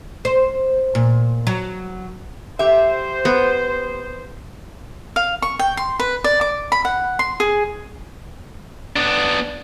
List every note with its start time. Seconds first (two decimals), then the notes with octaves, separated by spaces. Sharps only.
0.25 C5
0.95 A#2
1.47 F#3
2.59 G4 C5 E5
3.25 B3
5.16 F5
5.42 C#6
5.59 G5
5.77 C6
5.99 B4
6.24 D5
6.41 D6
6.72 B5
6.85 F#5
7.19 C6
7.40 G#4
8.96 B3 D4